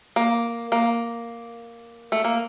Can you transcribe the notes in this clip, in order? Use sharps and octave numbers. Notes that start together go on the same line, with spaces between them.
A#3
A#3
A3
A#3